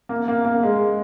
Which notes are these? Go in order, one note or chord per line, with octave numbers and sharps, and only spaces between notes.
A#3
A#3
A#3
G#3